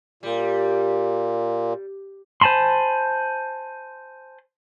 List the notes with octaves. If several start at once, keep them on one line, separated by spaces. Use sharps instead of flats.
A#2 G3
C5 G#5 A5 B5 C6